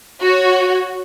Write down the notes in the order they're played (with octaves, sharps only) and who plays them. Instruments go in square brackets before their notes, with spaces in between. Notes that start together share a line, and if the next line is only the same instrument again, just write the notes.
[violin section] F#4 C#5